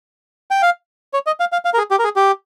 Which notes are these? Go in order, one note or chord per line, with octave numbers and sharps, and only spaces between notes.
G5
F5
C#5
D#5
F5
F5
F5
A#4
G#4
G4
A#4
G#4
G4